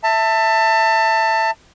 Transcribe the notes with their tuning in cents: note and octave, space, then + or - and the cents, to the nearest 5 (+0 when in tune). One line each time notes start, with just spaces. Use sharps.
E5 +0 A5 +25